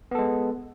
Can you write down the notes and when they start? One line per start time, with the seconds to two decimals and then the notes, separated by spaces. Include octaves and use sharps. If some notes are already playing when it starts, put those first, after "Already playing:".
0.11 B3
0.15 A4
0.19 G#3